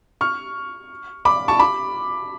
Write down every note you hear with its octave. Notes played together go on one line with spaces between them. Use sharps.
C#6 F6
B5 D6
A5 C#6
B5 D6